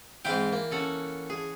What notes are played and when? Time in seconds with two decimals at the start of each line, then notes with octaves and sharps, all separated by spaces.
0.25 G#2 E3 C4 F5 G5
0.53 A#3
0.71 C#4 A4 F#5
1.30 G#4